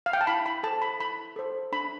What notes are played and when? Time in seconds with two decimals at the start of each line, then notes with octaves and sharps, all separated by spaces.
0.06 F5
0.13 G5
0.21 A5
0.27 E4 B5
0.46 B5
0.63 A4 C5 A5
0.82 B5
1.00 E4 B5
1.36 A4 C5
1.72 D4 B5